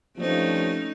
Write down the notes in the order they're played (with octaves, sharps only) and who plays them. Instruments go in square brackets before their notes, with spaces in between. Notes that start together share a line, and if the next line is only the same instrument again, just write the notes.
[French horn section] G2 C3 F3 [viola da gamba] A3 C#4 D#4